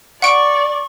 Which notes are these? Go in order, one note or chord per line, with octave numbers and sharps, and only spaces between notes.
D5 F#5 C#6 D7